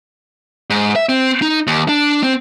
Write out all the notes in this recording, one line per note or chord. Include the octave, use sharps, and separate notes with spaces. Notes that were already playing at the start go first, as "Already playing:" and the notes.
G#2
E5
C4
D#4
D#2
D4
C4